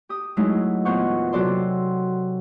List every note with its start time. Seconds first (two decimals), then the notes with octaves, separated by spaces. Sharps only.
0.09 G4 D#6
0.37 F#3 G#3 A3 D#4 E4
0.85 E2 A#2 F4 C5 F#5 C#6
1.33 C3 F#3 F#4 A4 D5 C6